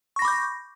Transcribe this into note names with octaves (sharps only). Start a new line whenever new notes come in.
B5 C#6 D6 G6 A#6